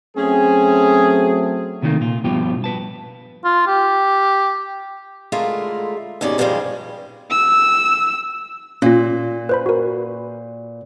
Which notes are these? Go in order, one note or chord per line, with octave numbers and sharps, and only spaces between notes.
F#3 A3 C4 C#4 G#4
C3 D#3 F#3 G3 A3 A#3
A#2 F4
G2 B2 F3 F4 G4
B4 A5
F4
G4
D3 G#3 A3 E4 F4 A#4
D#2 G#2 B2 C#4 D5
G2 D3 D#3 F3 G3 G#3
E6
A#2 C#4 F4
B4 C5 B5
F#4 A#4